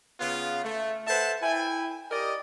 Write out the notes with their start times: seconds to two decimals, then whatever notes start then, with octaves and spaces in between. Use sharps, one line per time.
0.20 C#3 B3 F4
0.63 A3
1.07 A4 B4 C5 E5 F#5 A5
1.41 E4 G5 G#5
2.11 G4 A#4 D5 D#5